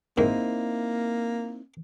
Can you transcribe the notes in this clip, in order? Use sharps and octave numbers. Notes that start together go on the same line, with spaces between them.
G#2 D#3 A#3 C4 D#4 E4